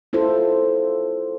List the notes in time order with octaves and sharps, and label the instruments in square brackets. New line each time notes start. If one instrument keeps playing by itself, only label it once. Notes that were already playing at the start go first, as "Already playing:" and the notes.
[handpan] E4 F4 A4 C5